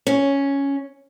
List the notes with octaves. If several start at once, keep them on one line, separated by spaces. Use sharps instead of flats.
C#4